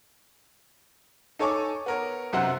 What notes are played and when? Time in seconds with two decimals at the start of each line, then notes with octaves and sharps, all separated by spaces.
1.39 D#4 A4 C#5 G#5 C#6 D6
1.86 B3 A#4 C#5
2.33 B1 F#2 C3 F#4 C5 F#5